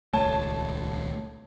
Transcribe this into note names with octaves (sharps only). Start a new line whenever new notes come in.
D#1 C#2 A3 C#5 A5